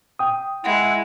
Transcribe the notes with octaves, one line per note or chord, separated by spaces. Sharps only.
G5 D#6
G#3 E4 F#5